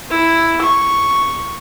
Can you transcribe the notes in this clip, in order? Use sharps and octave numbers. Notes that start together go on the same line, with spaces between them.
E4
C#6